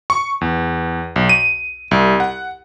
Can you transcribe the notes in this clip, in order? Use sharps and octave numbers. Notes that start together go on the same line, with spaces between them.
C#6
E2
B1
D#7
C2
F#5